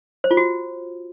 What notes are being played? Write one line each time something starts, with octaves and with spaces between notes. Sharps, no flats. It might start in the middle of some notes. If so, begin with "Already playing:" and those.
C5
F4
F#4